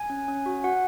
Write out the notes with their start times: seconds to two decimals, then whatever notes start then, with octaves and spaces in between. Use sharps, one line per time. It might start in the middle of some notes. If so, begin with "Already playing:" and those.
Already playing: G#5
0.10 C#4
0.28 C#4
0.46 F#4
0.64 F#4 F#5